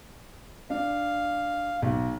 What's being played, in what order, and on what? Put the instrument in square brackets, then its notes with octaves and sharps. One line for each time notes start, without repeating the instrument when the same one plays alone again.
[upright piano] D4 [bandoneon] F5
[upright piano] B1